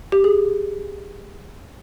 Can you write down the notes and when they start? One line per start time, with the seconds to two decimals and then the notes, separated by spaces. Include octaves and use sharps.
0.12 G4
0.24 G#4